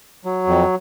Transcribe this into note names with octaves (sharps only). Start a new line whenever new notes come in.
F#3
F2